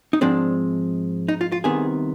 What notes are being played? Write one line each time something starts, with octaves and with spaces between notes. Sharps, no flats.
D#4
G#2 F3 G#3 C4 D4
D#4
F4
F4
C2 C3 D#3 B3 G#4